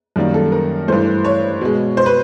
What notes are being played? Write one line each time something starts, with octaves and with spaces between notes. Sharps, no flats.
F#2 D#3 G3 A#3
A4
A#4
G2 E3 A3 C5
C#5
B2 G#3
C5
B4